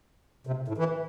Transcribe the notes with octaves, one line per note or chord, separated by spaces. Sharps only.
C3
A2
E3